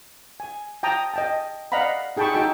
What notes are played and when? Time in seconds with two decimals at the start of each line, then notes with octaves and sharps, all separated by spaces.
0.40 G#5
0.83 G5 A5 A#5 D#6
1.14 D#5 G5 A5
1.72 D5 D#5 F5 F#5 A#5 B5
2.17 D#4 G#4 G5 A5 B5 C#6
2.33 D#4 F#4 G#4 G5 A5 E6